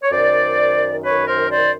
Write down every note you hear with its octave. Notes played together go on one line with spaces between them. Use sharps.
C#5
F#2 D#3 C5 D5
B4 C#5
A#4 C5
C5 D5